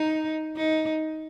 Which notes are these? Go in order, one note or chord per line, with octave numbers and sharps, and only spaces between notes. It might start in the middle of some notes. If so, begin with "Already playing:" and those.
Already playing: D#4
D#4